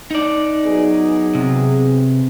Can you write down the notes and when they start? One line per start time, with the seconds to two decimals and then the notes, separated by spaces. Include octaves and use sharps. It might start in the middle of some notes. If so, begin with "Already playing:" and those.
0.11 D#4 D5
0.65 F#3 B3 G#4
1.35 C3